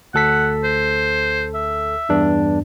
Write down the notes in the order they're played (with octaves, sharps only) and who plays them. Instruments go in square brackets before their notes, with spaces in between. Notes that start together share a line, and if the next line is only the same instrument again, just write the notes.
[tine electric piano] D2 A4 B6 [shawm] F#5
[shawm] C5
E5
[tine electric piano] E2 G2 D4